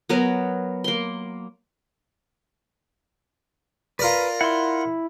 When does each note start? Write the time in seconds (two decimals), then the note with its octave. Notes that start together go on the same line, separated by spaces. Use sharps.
0.09 F#3 B3 A#4 C#5
0.84 A#3 C6
3.99 F4 A#4 B4 D5
4.41 E4 F#5 C6